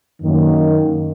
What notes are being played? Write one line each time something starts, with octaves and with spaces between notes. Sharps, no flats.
F#2 D#3 A#3